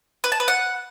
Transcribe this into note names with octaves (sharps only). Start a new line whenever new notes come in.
B4
A5
B4
F#5